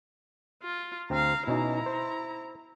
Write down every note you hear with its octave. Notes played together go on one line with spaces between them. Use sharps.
F4
D2 C4 F5 A#5
B2 C#4 D#4 E4 A#5
C5